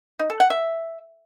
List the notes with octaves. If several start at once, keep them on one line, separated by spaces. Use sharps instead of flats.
D#4
A4
F#5
E5